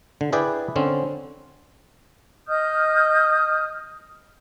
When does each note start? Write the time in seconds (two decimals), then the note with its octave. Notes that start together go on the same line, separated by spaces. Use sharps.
0.21 D3
0.33 E4 G#4 B4 D5 G5
0.76 D3 C4 C#4
2.47 D#5 D#6 F6 G6